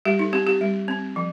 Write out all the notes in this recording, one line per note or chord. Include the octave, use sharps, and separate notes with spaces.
G3 G4
D#4
C4 G4
G4
G3
C4
F3